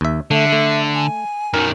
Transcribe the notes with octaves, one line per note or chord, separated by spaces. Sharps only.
D#2 E5
D3 A3 E5
A3
G#5
F#2 D#3 A#4